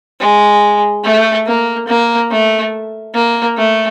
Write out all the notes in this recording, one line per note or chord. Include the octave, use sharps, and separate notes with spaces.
G#3
A3
A#3
A#3
A3
A#3
A3